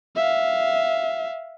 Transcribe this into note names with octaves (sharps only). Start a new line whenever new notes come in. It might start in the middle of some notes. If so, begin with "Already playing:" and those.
E5 F5